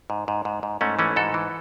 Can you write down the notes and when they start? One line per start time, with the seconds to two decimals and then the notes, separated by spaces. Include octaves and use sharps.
0.10 G#2
0.28 G#2
0.45 G#2
0.63 G#2
0.81 G#2 A3 C#4
0.99 E3 A3 C#4
1.16 G#2 F#4 A4
1.34 E3